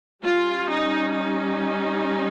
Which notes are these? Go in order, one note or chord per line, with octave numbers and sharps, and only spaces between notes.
G3 C#4 F4
D#4
D#4